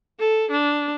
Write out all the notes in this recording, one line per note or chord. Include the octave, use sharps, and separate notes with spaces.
A4
D4